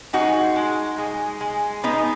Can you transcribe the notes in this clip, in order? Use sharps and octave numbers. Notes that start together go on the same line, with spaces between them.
G#3 D#4 F#4
G#3
G#3
G#3
G#3 B3 D#4